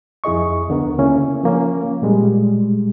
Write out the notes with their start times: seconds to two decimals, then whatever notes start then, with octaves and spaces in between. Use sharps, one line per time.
0.24 F2 E4 G#4 D#5 C#6
0.69 D2 D3 B3 A#4
0.98 C#3 A#3 C#4 E4
1.43 F3 A#3 C#4
2.02 A#2 G3 G#3